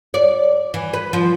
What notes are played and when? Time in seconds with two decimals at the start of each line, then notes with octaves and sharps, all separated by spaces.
0.14 D5
0.74 E3
0.93 B4
1.13 F3